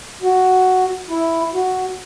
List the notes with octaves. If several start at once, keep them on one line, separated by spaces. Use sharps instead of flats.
F#4
E4
F#4